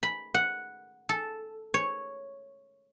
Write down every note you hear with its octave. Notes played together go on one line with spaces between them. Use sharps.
B5
F#5
A4
C#5